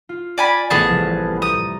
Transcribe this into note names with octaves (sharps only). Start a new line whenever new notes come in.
F4
D5 G#5 B5
A1 E3 F3 B3 G#4 A5
C2 F3
A#5 D#6 G6 A6